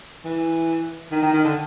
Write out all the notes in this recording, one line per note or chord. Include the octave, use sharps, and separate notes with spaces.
E3
D#3
D#3
D#3
D3